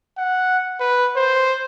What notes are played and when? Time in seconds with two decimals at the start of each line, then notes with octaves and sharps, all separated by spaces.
0.18 F#5
0.80 B4
1.16 C5